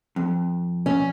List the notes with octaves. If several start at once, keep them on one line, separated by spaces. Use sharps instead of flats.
F2
C#4